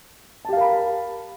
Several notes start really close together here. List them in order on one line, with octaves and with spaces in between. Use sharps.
A5 G4 F5 A#4 B5